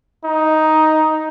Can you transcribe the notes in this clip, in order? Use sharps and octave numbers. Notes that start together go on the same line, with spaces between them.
D#4